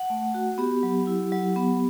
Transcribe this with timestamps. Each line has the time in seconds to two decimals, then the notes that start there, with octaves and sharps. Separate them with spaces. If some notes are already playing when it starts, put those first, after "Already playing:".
Already playing: F#5
0.10 A3
0.34 F#4
0.58 B3 G4
0.83 F#3
1.07 E4
1.32 F#3
1.56 B3